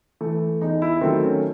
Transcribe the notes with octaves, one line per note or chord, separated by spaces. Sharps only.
E3 A3
E2 D#4
E4
D#3 F#3 A3 C4
C#4